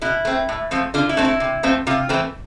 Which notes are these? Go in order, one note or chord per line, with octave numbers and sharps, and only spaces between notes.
B2 E4
A3 C4
A2
F3 A3 C4
D3 F4
E4
A3 C4
E4
C3
F3 A3 C4
C3 F4
E3 A3 C4